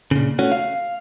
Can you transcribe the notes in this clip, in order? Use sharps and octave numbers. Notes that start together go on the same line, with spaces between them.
A#2 C#3
A3 C#4 F#4
F5